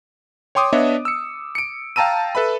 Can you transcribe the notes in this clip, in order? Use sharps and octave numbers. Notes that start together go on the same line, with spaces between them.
C#5 G5 C6 D6 D#6
B3 D4 C#5 D#5 E5
E6 C#7
C#7 D7
F5 G5 A5 A#5 E6 D#7
A4 B4 E5 B5